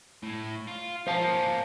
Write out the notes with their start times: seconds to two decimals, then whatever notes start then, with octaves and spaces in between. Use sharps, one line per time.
0.23 A2
0.67 F4
1.07 A#3 C#4 C5 F5 A5